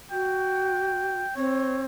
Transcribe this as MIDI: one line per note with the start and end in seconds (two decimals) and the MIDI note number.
0.11 1.22 66
0.11 1.34 79
1.36 1.86 60
1.36 1.82 73